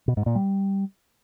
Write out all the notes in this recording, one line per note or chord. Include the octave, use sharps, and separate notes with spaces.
B2
G#2
A#2
G3